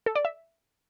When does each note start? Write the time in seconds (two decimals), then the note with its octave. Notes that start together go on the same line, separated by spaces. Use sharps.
0.06 A4
0.16 D5
0.25 E5